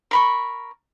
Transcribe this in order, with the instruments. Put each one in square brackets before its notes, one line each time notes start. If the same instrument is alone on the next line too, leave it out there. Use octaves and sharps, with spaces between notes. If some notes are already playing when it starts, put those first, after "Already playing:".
[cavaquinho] A#4 B5 C#6